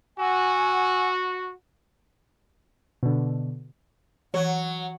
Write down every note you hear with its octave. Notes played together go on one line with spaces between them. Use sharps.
F#4 F#5 G#5 E6
B2 D3
E3 F#3 C#5 F#5